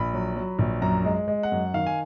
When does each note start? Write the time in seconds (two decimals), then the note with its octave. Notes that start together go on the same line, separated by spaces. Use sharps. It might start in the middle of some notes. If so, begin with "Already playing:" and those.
Already playing: A#1 B5
0.14 F#3
0.36 F#3
0.59 A#1
0.82 F#2 A#5
1.05 G#3
1.28 G#3
1.43 F#5
1.52 F#2
1.74 D#3 F5
1.87 G#5